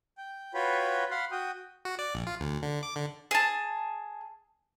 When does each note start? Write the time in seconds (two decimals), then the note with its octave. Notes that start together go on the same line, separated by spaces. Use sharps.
0.18 G5
0.54 F4 F#4 B4 C#5 G5 B5
1.11 F5 F#5 B5 C6
1.31 F#4 G5 D#6
1.85 F#4
1.99 D5
2.14 A#1
2.27 F4
2.40 D2
2.63 D3
2.83 D6
2.96 D3
3.31 G#4 A5